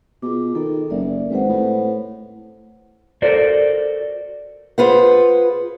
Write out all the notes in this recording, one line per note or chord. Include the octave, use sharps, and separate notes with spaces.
B2 F4 G#4 D6
D#3 A4
F#1 A#4 D5 E5
G#1 B4 C5 F#5
A2
F#4 A4 A#4 C5 D5
F4 G#4 B4 C5 F#5